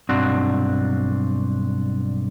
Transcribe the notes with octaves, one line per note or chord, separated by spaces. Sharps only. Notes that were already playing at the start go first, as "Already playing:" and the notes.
B1 G2 C4 D4 F#4